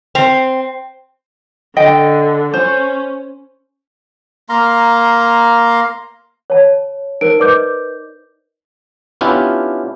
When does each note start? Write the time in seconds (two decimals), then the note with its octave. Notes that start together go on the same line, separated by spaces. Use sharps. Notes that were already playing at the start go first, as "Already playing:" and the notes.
0.15 C4
1.76 D3 D#5 G5
2.54 C#4 C5
4.49 A#3 F5 A#5 C6
6.50 C#5 A5
7.21 D#4 A#4 C5 D7
7.40 B4 D5 D#5 D6 G6
9.21 B3 C#4 D4 E4 F4 G4